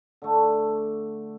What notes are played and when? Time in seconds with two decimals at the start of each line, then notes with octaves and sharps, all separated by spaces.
0.22 D3 A3